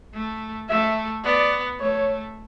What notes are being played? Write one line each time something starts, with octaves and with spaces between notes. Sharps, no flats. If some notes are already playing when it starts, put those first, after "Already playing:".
A3
A3 E5
B3 D5
A3 C#5